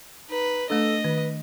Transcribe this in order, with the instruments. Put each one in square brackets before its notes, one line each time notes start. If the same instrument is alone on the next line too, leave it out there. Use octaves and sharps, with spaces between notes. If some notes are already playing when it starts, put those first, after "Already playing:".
[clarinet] D#4 [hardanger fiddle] B4
[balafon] A3 D4 [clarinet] A4 [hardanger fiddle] D#5
[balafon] D#3 [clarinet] B4